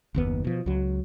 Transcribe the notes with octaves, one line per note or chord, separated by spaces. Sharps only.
F#1 D#2 B3
B2 F3
C#2 F#3